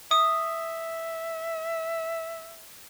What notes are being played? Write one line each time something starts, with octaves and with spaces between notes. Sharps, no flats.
E5 D#6